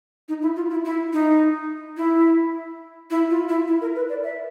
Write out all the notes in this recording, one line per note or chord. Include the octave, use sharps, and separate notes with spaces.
D#4
E4
F4
E4
E4
D#4
E4
E4
F4
E4
E4
A#4
B4
D5
E5